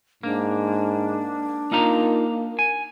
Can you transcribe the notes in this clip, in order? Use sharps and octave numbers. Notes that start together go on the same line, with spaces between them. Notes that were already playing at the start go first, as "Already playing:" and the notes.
G#2 A#3 D4
A#3 D#4 F4 A#5
G#5